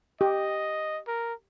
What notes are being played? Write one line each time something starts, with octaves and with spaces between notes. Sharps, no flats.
G4 D#5
A#4